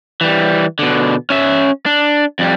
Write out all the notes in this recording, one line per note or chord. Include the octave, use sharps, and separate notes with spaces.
E3 G3
B2 D3
C#4 E5
D4
F2 G3